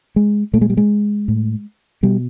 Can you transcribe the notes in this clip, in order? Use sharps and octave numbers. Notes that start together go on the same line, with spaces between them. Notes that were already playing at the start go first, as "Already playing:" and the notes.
G#3
A#2 A3
G#3
G3
G#3
A2
B2 G3